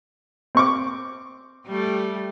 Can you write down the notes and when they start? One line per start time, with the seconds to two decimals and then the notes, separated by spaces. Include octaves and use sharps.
0.55 C4 C#6 D6
1.67 G3 A3